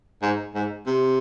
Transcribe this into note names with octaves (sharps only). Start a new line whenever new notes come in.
G#2
G#2
C3